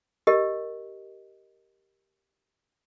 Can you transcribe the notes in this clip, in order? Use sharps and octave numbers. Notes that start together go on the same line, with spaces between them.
G4 A#4 D#5